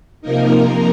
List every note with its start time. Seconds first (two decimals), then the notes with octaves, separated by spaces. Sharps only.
0.21 C3 F3 A#3 D#4 A#4
0.50 A#4